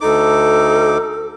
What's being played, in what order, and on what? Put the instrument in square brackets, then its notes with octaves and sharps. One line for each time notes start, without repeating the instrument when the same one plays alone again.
[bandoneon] D2 D#4 D6 [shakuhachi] A4